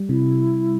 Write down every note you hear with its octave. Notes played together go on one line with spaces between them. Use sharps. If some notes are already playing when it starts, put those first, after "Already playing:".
Already playing: G3
C3 E4